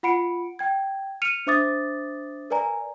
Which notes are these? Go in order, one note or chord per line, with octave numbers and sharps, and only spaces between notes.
F4 F#5 B5 C#7 D7
G5 G#6
F6 C#7 D#7 F7
D4 C5 E5 D6 D#6 A6
A#4 B4 D5 G#5 A#5